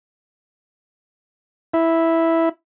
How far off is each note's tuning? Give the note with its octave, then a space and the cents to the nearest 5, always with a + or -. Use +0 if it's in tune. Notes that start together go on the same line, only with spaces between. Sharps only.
E4 -5